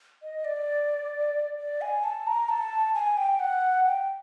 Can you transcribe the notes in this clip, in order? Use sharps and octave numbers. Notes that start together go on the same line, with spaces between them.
D#5
D5
D5
G#5
A5
A#5
A5
G#5
G5
F#5
G5